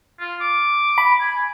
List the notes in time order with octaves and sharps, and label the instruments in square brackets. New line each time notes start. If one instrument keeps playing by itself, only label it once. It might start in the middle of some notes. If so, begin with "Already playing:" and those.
[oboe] F4
D6
[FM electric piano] B5
[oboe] G#5